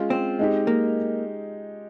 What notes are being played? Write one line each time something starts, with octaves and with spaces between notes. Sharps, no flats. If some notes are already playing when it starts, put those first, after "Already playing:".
Already playing: G#3 C#4 F4
C4
G#3 D#4 G4
A#3